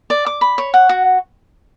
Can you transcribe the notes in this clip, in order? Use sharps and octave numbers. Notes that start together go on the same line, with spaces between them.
D5
D6
B5
C#5
F#5
F#4